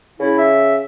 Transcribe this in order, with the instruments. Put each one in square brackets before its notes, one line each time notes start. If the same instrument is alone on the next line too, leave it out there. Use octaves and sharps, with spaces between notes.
[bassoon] C#3 [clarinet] E4
[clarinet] E5